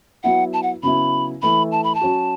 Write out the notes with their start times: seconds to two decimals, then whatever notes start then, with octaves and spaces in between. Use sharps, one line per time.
0.23 F#3 B3 E4 F#5
0.53 A5
0.63 F#5
0.83 C#3 F#3 B3 E4 B5
1.42 E3 A3 E4 B5
1.72 A5
1.84 B5
1.95 A5
2.01 F#3 C#4 F#4